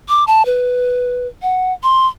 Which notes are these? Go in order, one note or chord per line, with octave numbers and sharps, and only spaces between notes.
D6
A5
B4
F#5
C6